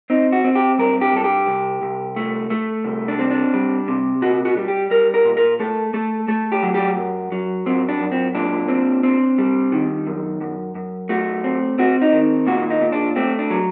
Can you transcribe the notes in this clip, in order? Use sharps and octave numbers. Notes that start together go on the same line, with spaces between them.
C4 D#4
F#4
C4
G4
G2 A#4
G4
G2 A4
G4
C2
C2
A3
A3
C2
D4
C4
D4
G3
C3
A#2 F#4
F#4
G3
G4
G3 A#4
A#4
A#2
A#4
A3 A4
A3 A4
A3 A4
G4
F#3
G4
F#2
F#3
F#2 C4
D4
F#2
C4
A#2 D4
C4
C4
G3
D#3
F#2
F#2
F#2
A3 F#4
C4
C4 F#4
D#4
D#3
A#2 F#4
D#4
A#2
D4
A3 C4
D4
F#3